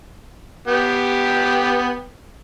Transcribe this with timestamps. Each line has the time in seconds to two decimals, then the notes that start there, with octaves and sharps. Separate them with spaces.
0.68 B3 G4 G5